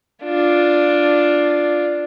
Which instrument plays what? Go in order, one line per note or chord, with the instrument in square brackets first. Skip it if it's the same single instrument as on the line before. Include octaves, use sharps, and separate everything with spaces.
[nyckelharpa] D4 F4